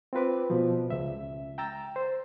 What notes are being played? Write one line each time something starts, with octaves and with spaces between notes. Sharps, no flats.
C4 F4 B4 D6
B2 F3
C#2 E5
G5 A#5 E6 A6
C5